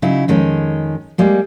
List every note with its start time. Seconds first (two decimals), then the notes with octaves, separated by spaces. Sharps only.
0.02 C#3 F#3 D#4 E4
0.28 F2 D#3 G#3 C#4
1.18 G3 G#3 A#3